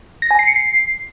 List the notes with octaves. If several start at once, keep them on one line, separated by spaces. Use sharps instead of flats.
A#6
G#5
C7
C#7
C7